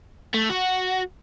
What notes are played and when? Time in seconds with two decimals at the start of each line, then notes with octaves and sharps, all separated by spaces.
0.34 A3
0.50 F#4